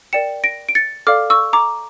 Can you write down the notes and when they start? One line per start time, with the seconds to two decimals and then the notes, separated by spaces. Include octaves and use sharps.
0.13 A#4 D5 G5 C#7 E7
0.44 A#6 D7
0.69 D7
0.75 A6 C#7
1.07 A4 D5 F5 D6 F6
1.30 C#6 E6
1.53 A#5 D6